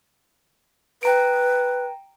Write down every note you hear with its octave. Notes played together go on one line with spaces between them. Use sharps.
B4 G5 A#5 D7